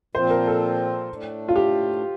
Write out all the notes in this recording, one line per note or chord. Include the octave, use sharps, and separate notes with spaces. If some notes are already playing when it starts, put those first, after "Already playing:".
A#2 F3 C4 F4 C5
A#4
A4
A2 A3 D4
F4
G4